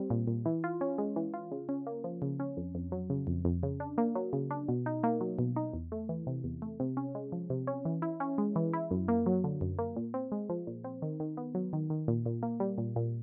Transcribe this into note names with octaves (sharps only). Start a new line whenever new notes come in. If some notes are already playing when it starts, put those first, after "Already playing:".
Already playing: G3 C4
A#2
A#2
E3
F4
C#4
G#3
E3
F4
C#3
C#4
A#3
F3
C#3
C#4
F2
F2
F#3
C#3
F2
F2
C#3
D4
A#3
F#3
C#3
D4
B2
D#4
A#3
F#3
B2
D#4
E2
A3
E3
C3
E2
A3
C3
C#4
G#3
F3
C3
C#4
E3
E4
C#4
G#3
E3
E4
F#2
A#3
F#3
D3
F#2
A#3
A#2
C4
G#3
F3
A#2
C4
D#3
D#3
B3
F#3
D#3
D#3
A#2
A#2
A#3
G3
A#2
A#2